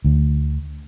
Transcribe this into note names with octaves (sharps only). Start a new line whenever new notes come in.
D2